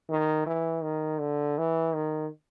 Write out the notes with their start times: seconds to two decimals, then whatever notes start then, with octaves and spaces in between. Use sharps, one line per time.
0.10 D#3
0.47 E3
0.83 D#3
1.20 D3
1.58 E3
1.95 D#3